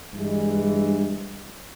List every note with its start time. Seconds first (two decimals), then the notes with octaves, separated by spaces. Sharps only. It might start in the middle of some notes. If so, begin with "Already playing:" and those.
0.14 G2 E3 G#3